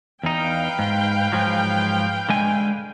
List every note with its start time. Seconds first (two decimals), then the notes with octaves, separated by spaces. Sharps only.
0.23 E2 D#4 B4 F5 G5
0.79 G#2
1.32 G#2 F3 F#3
2.29 D3 G#3 G#5